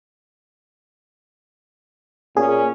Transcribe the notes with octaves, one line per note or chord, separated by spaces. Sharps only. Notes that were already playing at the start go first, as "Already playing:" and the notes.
A#2 C#4 G#4